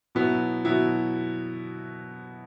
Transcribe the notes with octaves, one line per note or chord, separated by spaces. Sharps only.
B2 F#3 B3 E4
B2 F#3 B3 E4